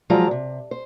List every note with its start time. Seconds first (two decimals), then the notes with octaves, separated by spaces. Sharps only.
0.10 F3 F#3 G#3 F4 D5 A#5
0.31 C3
0.71 C5